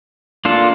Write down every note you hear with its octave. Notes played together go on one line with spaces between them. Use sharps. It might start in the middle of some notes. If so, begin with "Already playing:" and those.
A#3 D4 F4 A4